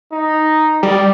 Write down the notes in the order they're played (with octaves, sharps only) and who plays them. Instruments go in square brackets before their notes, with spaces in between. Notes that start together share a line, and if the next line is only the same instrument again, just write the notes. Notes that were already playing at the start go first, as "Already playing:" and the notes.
[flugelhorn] D#4
[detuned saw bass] G3 [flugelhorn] D5